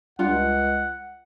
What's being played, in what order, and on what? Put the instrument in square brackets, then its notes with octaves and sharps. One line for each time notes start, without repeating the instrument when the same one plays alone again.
[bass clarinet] C#2 [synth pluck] G3 D4 F4 [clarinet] F#5